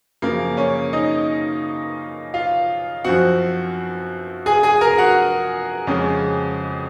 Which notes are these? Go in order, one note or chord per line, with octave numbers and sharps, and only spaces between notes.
F#2 C#3 F3 A#3 A#4
C#4 C#5
D#4 D#5
F4 F5
F#2 F3 C4 F#4 F#5
G#4 G#5
G#4 G#5
A#4 A#5
F#4 F#5
F2 C#3 G#3 C#4